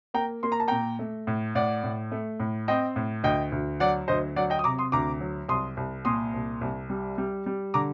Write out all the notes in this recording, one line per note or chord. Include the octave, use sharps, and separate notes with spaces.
A#3 G5 A#5
A#3 C6
A#5
A5
A#2 G5 A#5
A3
A2
A2 D5 F#5
A2
A3
A2
C4 D#5 G5
A2
D2 D#5 G5
D2
F#3 D5 F#5
D2 C5 D#5
F#3 D5 F#5
D#5 G5
D#6
C3 A#5 D6
C6 D#6
D2 A#5 D6
F#3
C2 C6 D#6
C2
A#2 C6 D#6
C2
C2
G3
G3
G3
D3 A#5 D6